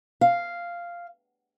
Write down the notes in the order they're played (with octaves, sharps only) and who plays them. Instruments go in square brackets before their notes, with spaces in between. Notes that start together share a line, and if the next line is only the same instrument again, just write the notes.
[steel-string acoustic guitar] F5